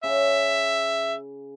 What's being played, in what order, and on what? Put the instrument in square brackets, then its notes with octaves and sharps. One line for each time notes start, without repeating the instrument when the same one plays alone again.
[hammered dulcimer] C#3 [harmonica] E5